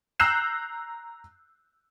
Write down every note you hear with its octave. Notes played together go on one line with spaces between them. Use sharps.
A#5 E6 F#6 G6 C7 E7